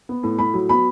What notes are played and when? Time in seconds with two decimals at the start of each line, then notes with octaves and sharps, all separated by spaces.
0.09 B3
0.23 A2
0.39 A2 B5
0.54 F#3
0.69 B3 B5